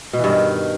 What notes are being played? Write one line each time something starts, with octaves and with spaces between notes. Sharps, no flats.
B2
E3
G2
D#3